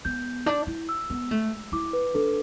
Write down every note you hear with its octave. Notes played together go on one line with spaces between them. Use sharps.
B3 G6
D4
E4
E6
B3
A3
E4 D6
B4
D4 A4